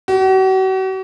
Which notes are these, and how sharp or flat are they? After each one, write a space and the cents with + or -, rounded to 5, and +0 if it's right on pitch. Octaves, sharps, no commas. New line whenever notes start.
F#4 +40